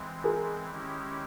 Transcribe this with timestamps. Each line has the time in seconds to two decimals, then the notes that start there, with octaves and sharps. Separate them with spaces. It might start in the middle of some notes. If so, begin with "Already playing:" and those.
Already playing: E3 G#3 C4
0.24 G#4 A#4
0.71 D#3 G#3 C#4 E4 G4